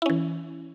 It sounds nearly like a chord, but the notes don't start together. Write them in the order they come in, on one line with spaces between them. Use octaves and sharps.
E4 C#4 E3